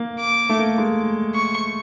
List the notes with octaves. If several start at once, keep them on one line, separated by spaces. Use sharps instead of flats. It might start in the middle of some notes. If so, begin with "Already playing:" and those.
Already playing: A#3
D6
A3
A#3
G#3
C#6